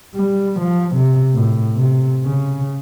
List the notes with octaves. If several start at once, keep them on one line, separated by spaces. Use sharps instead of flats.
G3
F3
C3
A2
C3
C#3